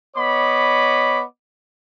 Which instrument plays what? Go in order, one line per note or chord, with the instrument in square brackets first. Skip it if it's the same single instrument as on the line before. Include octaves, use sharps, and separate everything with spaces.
[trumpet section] B3 C#5 D#5 B5 D6